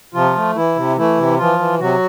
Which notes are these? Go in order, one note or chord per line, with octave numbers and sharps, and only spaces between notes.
C3 F3 F4
A3
E3 E4
C3
E3 A3 E4
C3
E3 F3 F4
E3
C3 F#3 F#4